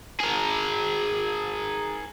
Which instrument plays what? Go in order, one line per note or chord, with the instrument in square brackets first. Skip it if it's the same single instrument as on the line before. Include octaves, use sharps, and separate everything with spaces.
[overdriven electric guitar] G#4 A#4